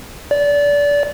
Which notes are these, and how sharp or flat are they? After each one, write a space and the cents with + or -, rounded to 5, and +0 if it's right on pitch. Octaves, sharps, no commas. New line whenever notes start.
D5 -25